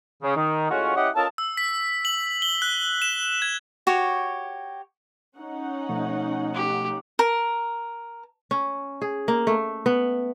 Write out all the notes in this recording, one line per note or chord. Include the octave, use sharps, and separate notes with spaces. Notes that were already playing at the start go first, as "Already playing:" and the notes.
C#3
D#3
A2 G#3 C#4 F4 F#4
C#4 E4 G4 D#5 F#5
C#4 F4 A4 A#4 D#5 A5
E6
B6
F#7
G7
F#6
E7
G#6
F#4 G4 C#5
C#4 D#4 F#5
B2 F3 A3
G4
A#4
C#4
G#4
A#3
A3
B3